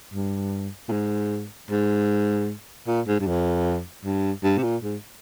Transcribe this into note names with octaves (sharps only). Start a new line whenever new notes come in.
G2
A#2
G#2
G#2
A#2
G#2
G2
F2
G2
G2
C3
A#2
G#2